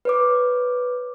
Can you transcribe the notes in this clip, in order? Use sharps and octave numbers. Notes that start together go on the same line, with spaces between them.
B4 C#5 D6